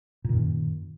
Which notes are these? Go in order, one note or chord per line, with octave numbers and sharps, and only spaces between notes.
F#2 A#2 D#3